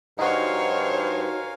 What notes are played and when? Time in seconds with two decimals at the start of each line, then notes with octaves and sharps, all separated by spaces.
0.19 G2 D#4 F#4 A#4 C5 C#5 F5 G#5